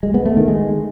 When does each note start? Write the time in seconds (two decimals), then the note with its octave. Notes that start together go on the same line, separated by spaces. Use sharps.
0.03 G#3
0.14 B3
0.26 A3
0.37 D#3
0.48 G#3